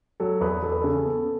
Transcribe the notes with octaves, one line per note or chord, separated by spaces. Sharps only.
F#3 A4
E2 B4
E2 A4
B4
C#3 A4
B3